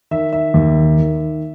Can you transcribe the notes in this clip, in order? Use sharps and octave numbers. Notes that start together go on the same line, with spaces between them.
D#3 E5
E5
D#2
D#3